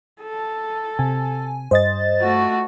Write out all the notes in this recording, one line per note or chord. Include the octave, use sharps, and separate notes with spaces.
A4
C3 G#5
G2 C5 D#5 A6
A3 F#4